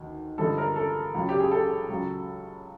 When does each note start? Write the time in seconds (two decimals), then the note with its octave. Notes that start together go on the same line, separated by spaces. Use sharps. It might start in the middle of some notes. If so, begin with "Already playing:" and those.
Already playing: D2 D#3
0.38 G2 D3 F3 G#3 A4
0.58 A#4
0.76 A4
1.14 C#2 C#3 F#3
1.29 G4
1.40 G#4
1.52 A4
1.89 C#2 C#3 F#3